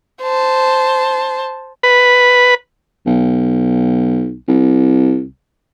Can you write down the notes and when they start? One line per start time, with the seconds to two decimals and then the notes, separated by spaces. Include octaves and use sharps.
0.23 C5 A5
1.83 B4
3.06 B1
4.48 C2